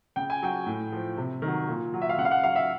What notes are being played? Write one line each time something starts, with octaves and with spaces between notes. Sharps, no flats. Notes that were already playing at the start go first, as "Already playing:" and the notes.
C#3 G5
G#5
F#3 G5
A2
F3
C3
D#3 F#3
A#2
F#3
E5
F5
C#3 F#5
F5
F#5
F#3 F5
E5